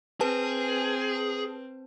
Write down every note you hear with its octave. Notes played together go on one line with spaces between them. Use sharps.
C4 G#4 B4 A5